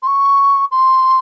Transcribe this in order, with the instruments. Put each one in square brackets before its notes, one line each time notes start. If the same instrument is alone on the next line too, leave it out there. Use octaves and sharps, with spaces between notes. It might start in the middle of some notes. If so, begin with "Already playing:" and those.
[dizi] C6
C#6
C6